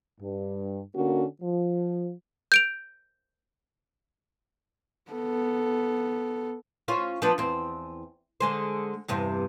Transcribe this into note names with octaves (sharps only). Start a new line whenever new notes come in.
G2
D3 A#3 C#4 F#4
F3
G6 D7 F7
B3 A4
C#4 F4 C5
F3 B3 D4
E2 C4
D3 G#3 C5
E2 G2 C3